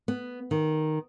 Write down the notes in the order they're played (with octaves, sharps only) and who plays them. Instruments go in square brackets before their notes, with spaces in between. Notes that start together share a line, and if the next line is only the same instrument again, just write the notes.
[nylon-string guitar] B3
D#3